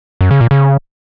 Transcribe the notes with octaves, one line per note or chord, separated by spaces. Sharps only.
F#2
C#3
A#2
C#3